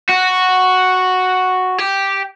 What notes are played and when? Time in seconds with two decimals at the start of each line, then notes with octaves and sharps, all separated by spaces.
0.09 F#4
1.79 G4